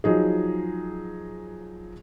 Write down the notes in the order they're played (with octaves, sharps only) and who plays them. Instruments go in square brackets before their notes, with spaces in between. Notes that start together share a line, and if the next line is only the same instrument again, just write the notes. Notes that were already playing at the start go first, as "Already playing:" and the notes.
[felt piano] F3 F#3 D#4 G#4